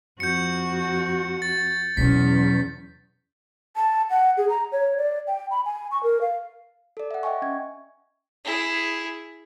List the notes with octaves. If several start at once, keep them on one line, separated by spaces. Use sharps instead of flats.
F2 F#4 G6 C#7
A6
E2 B2 F#3 C#4 B6
A5
F#5
G#4
A#5
C#5
D5
G5
B5
G#5
C#6
A#4
F5
A4 D5
E5 F#5
D#5 E5 G5 G#5 C#6
C#4 G#6
E4 G#4